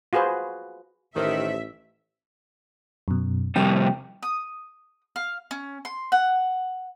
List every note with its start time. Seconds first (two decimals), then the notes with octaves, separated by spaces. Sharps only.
0.13 F4 F#4 G#4 B4 C5
1.15 A1 D#3 G4 A4 C5 E5
3.08 F#2 B2
3.56 F2 C3 G3 G5
4.23 D#6
5.16 F5
5.51 C#4
5.85 C6
6.12 F#5